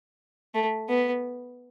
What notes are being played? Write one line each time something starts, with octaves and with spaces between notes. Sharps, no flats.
A3
B3